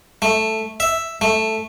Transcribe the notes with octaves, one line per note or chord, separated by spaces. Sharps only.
A3
E5
A3